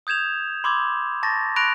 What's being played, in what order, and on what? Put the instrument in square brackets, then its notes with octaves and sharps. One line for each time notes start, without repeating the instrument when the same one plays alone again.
[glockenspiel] D#6 G6 G#6 E7 F7
B5 C6 D6 E6 G#6
A5 C#6 A6 A#6
B5 C#6 F#6 A#6 D7 F7